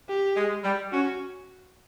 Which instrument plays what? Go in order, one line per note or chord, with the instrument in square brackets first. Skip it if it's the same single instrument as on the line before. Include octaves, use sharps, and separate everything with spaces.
[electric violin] G4
[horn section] G#3
G3
[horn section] C#4 [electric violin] F#4